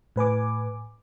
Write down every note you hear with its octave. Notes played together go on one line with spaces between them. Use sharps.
A2 B4 G#5 D6